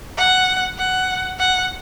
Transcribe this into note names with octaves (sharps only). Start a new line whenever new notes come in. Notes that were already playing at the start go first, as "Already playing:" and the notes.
F#5
F#5
F#5